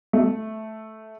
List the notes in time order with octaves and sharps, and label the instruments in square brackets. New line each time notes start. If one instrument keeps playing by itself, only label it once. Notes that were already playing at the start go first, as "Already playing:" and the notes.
[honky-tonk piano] A3